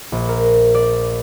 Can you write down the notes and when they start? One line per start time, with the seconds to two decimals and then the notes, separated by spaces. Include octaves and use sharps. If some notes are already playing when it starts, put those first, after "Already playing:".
0.12 A#1
0.29 A#4
0.75 D5